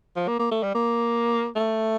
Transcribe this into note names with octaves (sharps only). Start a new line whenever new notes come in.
F3
A#3
A#3
A3
G3
A#3
A3